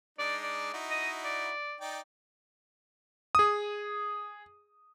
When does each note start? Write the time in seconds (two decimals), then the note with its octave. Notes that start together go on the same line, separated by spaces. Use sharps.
0.19 G#3 D4 D#4 D5
0.43 D5
0.73 D#4 E4 F#4
0.90 D#5
1.24 D5
1.81 D#4 D5 G5
3.35 G#4 D#6